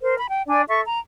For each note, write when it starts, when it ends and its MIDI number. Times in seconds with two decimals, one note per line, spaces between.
0.01 0.17 70
0.01 0.17 72
0.17 0.28 83
0.30 0.44 79
0.47 0.62 62
0.47 0.62 74
0.47 0.62 80
0.68 0.81 69
0.68 0.81 76
0.68 0.81 85
0.86 0.99 82